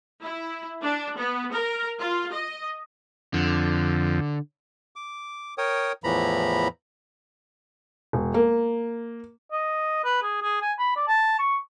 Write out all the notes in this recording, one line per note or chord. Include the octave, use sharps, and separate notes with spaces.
E4
D4
B3
A#4
F4
D#5
F2 D3
D6
A#4 C#5 G5 D#6
E2 A2 E3 F3 A#5 B5
E1
A#3
D#5
B4
G#4
G#4
G#5
B5
D5
A5
C#6